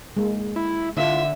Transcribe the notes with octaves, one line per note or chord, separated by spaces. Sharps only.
G#3 A#3
E4
D3 E4 F4 E5